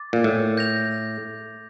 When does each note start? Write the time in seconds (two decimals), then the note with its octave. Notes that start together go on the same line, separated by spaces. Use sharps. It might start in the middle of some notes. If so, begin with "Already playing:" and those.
Already playing: D6 A6
0.13 A#2
0.24 A2
0.57 G6 A#6 F7